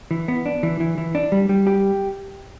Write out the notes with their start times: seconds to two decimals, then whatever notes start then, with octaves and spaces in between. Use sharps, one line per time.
0.11 E3
0.28 B3
0.46 D4
0.63 E3
0.80 E3
0.98 E3
1.15 D4
1.32 G3
1.49 G3
1.67 G4